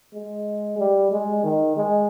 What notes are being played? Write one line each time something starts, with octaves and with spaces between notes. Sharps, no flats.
G#3
G3
G#3
D#3
G#3